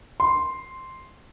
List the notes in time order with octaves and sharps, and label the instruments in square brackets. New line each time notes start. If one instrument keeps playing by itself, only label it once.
[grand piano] C6